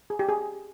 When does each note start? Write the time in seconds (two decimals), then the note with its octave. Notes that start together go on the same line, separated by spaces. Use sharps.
0.10 G#4
0.19 G4
0.29 G#4